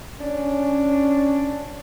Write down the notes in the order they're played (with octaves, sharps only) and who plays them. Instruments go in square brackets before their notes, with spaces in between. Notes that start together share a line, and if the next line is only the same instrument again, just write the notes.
[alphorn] C#4 [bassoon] D4